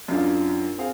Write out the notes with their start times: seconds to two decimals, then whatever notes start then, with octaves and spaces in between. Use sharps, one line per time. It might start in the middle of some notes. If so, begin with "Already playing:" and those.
0.08 F#2 D4 D#4 F4
0.78 C4 G#4 F5